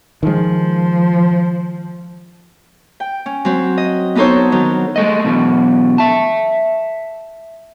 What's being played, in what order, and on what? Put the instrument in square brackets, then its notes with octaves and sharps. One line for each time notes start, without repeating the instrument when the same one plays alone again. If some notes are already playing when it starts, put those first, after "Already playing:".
[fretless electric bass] D#3 G#3 [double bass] F3
[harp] G5
C#4
F#3 C4
D#5
B3 D4 D#4 A4 C5 C#5
D#3 F#3
[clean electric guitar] G#3 A3 D#5
B2 E3 F#3
E5 A5